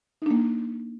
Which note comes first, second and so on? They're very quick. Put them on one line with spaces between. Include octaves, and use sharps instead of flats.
D#4 D4 A#3